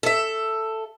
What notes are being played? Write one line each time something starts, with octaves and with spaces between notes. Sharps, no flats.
A4 E5